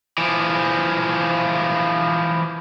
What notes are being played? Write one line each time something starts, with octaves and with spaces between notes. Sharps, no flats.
E3 F3